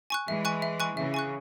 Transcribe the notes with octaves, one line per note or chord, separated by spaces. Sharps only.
G#5 C#6 F#6
E3 G#3 E5
G#5 C#6 F#6
E5
G#5 C#6 F#6
C#3 E3 E5
G#5 C#6 F#6